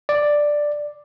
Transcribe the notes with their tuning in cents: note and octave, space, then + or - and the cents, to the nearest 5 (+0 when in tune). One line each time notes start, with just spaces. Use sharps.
D5 +5